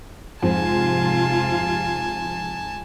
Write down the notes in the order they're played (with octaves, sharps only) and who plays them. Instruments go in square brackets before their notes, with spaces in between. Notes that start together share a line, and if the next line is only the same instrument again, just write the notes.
[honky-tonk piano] F2 G#2 C4 [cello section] C3 F4 [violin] G#5 A5